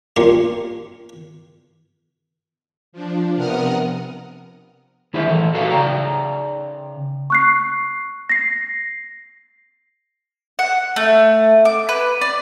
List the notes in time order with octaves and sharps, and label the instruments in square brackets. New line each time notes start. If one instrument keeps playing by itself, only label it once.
[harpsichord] A#3 C#4 D4 F4 G4
[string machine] F3 D4
C3 B3 A#4 F#5 D#6 F6
[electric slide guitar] D#3 E4 G#4 C5 E5
E3 A4
F#4 A4 B4 C#5 F5
C#3 D5 G5 A#5
[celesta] C#6 F#6 C7
A#6 C7
[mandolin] F#5
A3
D6
B4
D5